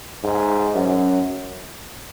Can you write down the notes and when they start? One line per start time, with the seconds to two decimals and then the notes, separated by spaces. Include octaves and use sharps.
0.24 G#2
0.74 F#2